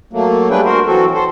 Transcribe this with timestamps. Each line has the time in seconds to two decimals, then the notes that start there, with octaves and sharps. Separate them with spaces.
0.13 F#3 A3 A#3
0.51 G3 D4 G#4 B4 G5
0.65 F#4 A#4 C5
0.87 E3 F#3 C4 F#4 A4
1.14 A4 C5